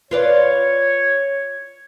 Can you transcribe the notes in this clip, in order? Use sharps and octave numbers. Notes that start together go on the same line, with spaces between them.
F4 B4 C#5 D5